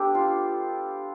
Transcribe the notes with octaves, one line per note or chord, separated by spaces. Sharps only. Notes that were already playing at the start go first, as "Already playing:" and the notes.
Already playing: B3 D4 G4 A4
F4